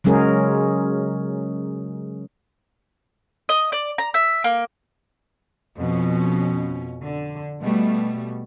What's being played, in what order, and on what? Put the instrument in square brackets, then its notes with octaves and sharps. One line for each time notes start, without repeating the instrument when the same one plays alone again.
[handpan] C#3 F#3 G#3 C#4 G#4 A#4
[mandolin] D#5
D5
A#5
E5
A#3
[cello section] F2 B2 C#4
D3
B2 G3 A3